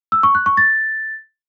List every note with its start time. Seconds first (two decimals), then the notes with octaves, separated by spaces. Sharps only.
0.12 E6
0.23 C#6
0.35 F#6
0.46 C#6
0.57 A6